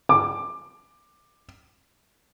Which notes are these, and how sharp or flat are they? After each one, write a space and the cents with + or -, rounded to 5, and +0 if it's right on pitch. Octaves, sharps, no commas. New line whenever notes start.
D6 +15